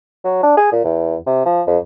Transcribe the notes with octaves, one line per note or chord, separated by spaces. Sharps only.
F#3
D4
G#4
A#2
E2
C3
F3
F2